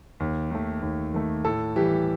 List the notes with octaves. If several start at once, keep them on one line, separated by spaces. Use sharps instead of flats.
D#2
D#3 A3
D#2
D#3 A3
A2 A4
E3 G3 G4